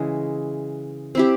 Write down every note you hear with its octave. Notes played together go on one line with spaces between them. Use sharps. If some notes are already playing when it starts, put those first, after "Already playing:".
Already playing: C#3 E3 G#3
C4 E4 G4